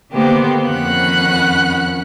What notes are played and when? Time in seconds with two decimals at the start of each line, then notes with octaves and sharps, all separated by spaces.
0.11 D3 D#3 A#3 B3 G4 C5
0.69 F2 D#3 C#4 F#5 B5 F#6